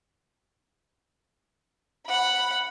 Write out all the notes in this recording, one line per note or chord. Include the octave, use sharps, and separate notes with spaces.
F#5 B5